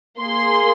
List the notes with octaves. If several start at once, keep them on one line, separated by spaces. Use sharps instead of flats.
A#3 G#4 C6